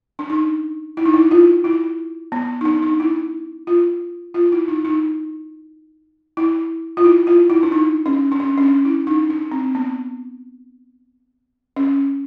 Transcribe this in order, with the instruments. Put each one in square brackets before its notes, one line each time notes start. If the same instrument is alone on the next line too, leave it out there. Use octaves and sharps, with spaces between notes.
[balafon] D4
D#4
E4
D#4
E4
F4
E4
B3
D#4
D4
D#4
E4
F4
F4
E4
D#4
D#4
E4
F4
E4
F4
E4
D4
D#4
C#4
D4
C#4
C#4
D4
E4
D#4
D4
C4
B3
C#4